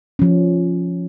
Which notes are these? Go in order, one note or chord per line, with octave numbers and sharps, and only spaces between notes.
F3 C#4